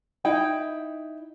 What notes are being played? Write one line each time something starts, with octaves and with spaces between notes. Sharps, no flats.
D#4 E4 G5